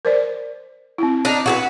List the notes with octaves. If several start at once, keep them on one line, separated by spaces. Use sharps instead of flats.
A#4 C5 D5
C4 E4
D4 D#4
F#4 G#4 B4